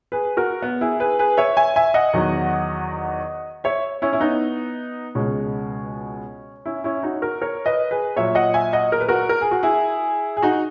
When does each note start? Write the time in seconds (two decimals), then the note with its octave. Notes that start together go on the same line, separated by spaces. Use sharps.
0.12 G#4 B4
0.37 F#4 A#4
0.62 B3
0.81 E4 G#4
1.00 G#4 B4
1.19 G#4 B4
1.37 C#5 E5
1.57 E5 G#5
1.76 E5 G#5
1.94 D#5 F#5
2.13 E2 D#3 F#3
3.64 C#5 E5
4.02 C#4 E4
4.13 E4
4.20 B3 D#4
5.15 C#2 B2 G#3 C#4
6.66 C#4 E4
6.84 C#4 E4
7.03 D#4 F#4
7.22 F#4 A#4
7.41 A#4 C#5
7.66 B4 D#5
7.91 G#4 B4
8.16 A#2 F#3 C#5 E5
8.35 D#5 F#5
8.54 E5 G#5
8.73 D#5 F#5
8.92 A#4
9.00 B4
9.08 F#4 A#4
9.29 A#4
9.41 G#4
9.51 F#4
9.63 E4 G#4
10.37 G#4
10.42 D#4 F#4